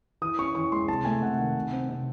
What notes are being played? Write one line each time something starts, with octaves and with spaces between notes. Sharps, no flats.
E3 D#6
C#4 C#6
E3 C#6
G#3 C6
C3 A5
A3 G#5
C3 F#5
D#3 F#5
C3
C4
C3